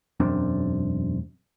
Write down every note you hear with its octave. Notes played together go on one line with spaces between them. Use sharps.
E1 F#2 C4 D4